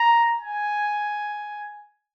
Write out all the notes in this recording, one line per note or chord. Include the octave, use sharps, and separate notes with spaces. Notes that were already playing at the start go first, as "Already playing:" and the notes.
Already playing: A#5
G#5